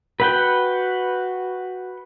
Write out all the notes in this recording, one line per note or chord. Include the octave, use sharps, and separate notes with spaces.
F#4 B4 F#5 G5